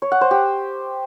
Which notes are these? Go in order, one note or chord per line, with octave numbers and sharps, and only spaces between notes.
C#5
F#5
C5
G4